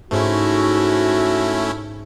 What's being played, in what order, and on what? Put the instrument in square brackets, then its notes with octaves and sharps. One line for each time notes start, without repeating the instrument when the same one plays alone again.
[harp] G#2 [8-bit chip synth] A3 C#4 E4 [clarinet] F#4